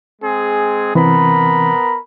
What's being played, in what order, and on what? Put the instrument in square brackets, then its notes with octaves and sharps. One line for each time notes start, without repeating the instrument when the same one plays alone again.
[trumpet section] G#3 C4 G#4
[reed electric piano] C3 E3 C4 [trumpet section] B3 A#4 B5